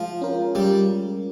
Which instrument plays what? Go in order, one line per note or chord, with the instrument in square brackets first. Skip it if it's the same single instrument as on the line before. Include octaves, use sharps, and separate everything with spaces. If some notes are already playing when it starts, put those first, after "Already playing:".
Already playing: [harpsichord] F3 [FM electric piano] G#3
[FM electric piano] C#4 F4 A#4
[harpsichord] G3 [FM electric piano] G#3